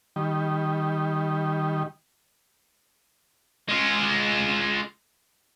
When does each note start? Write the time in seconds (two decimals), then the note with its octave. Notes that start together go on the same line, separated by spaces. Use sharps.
0.16 D#3 G3
3.69 G#3 F4